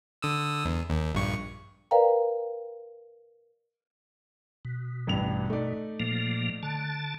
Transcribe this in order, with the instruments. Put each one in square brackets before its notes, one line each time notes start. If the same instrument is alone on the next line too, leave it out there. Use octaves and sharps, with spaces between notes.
[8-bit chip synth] D3 D#6 E6
E2
D#2
A#1 G2 C#6
[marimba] A#4 B4 D5 F5 G5 A#5
[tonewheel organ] B2
[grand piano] A1 G2 F7
A3 D#4 D5
[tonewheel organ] A#2 F3 A#3
D3 A5